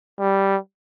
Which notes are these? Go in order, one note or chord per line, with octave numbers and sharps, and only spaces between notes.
G3